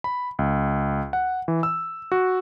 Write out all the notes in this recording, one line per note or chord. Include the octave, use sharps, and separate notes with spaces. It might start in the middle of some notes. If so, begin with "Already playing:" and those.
B5
C#2
F#5
E3
E6
F#4